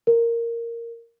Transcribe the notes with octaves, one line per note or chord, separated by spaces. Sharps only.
A#4